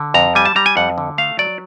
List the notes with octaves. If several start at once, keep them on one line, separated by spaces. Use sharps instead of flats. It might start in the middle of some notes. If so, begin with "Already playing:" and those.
Already playing: D3
F2 A#5
G3 G#5
A5
G3 A#5
G#5
F2 F#5
D3
A3 F5
F#3 D5